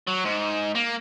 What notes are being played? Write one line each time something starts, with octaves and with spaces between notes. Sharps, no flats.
F#3
G#2
A#3